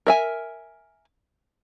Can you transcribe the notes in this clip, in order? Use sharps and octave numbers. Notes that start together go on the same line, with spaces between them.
A#4 E5 G#5